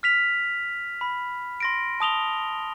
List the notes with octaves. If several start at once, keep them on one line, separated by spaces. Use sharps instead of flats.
F6 B6 F7
B5
C6 A#6 D7
A5 D#6 F7 G7